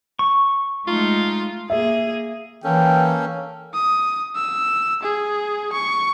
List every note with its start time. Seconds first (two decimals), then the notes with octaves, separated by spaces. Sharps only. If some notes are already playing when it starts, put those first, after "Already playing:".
0.19 C#6
0.88 G#3 A3 D#4 F4
1.70 A#3 G#4 E5
2.64 E3 A#3 C#4 A4 G5
3.74 D#6
4.36 E6
5.03 G#4
5.73 C#6